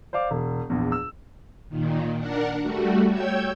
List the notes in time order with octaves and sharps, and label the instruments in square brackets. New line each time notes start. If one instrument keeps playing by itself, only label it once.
[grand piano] C5 D5 F5 D6
E1
A#1 E2
E6
[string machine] A#2 D#3
D4 A#4 F#5
G3 A3 F#4
C#5 G5 E6 G6 G#6